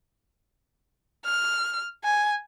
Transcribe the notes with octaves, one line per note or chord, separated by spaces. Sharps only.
F6
G#5